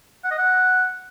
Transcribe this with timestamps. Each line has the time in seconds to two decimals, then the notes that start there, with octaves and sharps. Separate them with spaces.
0.24 F#5
0.31 D#5
0.38 F#5